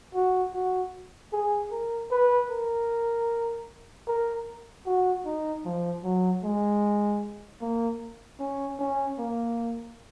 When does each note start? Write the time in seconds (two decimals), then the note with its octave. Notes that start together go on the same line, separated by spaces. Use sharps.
0.15 F#4
0.54 F#4
1.33 G#4
1.72 A#4
2.11 B4
2.50 A#4
4.08 A#4
4.86 F#4
5.26 D#4
5.65 F3
6.04 F#3
6.44 G#3
7.62 A#3
8.40 C#4
8.79 C#4
9.19 A#3